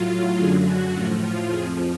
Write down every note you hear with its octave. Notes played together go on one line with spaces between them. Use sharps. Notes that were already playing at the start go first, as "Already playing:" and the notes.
Already playing: A2 F#3 F4
F#2 D3 F#3 G#4
F#4
A2 F3 F4
F4
F2 F3 G#4